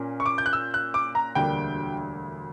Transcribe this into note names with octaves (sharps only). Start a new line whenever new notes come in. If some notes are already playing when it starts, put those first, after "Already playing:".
Already playing: A#2 A#3 C#4
C#6
D6
G6
F#6
E6
F#6
D6
A#5
E1 D2 D3 G3 A#3 G5